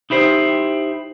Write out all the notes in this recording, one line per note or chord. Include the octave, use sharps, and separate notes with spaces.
D#4 E4 G4 C5